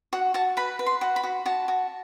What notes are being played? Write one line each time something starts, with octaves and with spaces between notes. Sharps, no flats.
F#4 F#5
F#4 A5
B4 B5
B4
C6
F#4
B5
F#4
F#4 A5
F#4